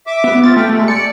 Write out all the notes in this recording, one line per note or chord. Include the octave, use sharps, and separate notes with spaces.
E5 D6
B3
C4 F4 A6
A3 G5
C3 G#3
D5 C#7